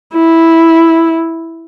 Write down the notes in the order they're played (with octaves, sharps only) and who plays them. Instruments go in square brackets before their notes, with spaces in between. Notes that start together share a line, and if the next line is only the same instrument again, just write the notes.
[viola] E4